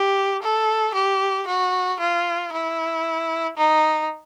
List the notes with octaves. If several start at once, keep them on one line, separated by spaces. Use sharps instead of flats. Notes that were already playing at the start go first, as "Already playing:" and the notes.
Already playing: G4
A4
G4
F#4
F4
E4
D#4